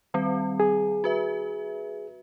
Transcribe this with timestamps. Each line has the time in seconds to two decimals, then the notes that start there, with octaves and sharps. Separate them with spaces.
0.14 D#3 G3 C4
0.60 G#4
1.04 F#4 B4 E5